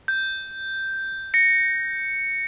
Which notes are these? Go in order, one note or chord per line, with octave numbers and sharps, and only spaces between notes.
G6
A#6 C#7